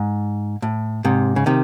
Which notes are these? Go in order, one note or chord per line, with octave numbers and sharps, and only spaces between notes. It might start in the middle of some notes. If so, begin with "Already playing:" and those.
Already playing: G#2
A2
G#2 C3
C#3
C3 D#3